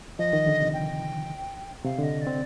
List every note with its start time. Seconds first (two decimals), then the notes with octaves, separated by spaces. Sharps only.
0.19 F3 D#5
0.33 D#3
0.47 D3
0.61 C3
0.74 G5
1.85 C3 F5
1.99 D3 D#5
2.22 D5
2.27 C4